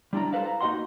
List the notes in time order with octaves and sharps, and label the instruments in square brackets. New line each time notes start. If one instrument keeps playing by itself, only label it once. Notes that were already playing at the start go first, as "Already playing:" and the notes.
[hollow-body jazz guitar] G3 D4 E4 A#5
A4 B4 C5 F5
A#5
A#3 D#4 F#4 D#5 F#5 C6